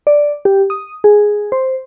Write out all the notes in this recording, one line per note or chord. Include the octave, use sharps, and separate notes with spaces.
D5
G4
D#6
G#4
C5